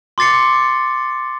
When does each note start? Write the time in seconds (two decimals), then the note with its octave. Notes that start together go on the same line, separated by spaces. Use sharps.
0.18 C6 D6 A6 C7 C#7